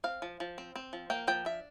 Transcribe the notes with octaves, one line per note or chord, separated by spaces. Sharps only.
C4 F5
F3
F3
C4
C4
F3
A#3 G5
F3 G5
D4 E5